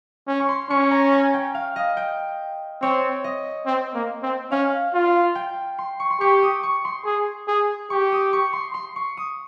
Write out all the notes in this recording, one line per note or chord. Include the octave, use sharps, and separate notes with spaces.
C#4
C#6
C6
C#4 C#6
A#5
G#5
G5
F5
D#5
G5
C4 C#5
D#5
C4
A#3
C4
C#4 F5
F4
G5
C6
C#6
C6
G4 C#6
D#6
C#6
C6
G#4
G#4
G4 C#6
D#6
C#6
C6
C6
C#6
D#6